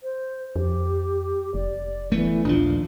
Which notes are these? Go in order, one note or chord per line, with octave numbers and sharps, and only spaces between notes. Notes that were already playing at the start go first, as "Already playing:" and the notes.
C5
F2 G4
F1 D5
E3 A3 B3
A#1 D#2 F3 D4 F4